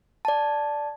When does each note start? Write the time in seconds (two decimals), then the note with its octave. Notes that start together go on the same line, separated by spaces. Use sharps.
0.25 D5 A5